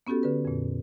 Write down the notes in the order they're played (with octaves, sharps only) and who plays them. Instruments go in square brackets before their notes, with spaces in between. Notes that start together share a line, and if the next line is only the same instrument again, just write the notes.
[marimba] B3 C#4 F#4 G4 A4
D3 B4
F2 A#2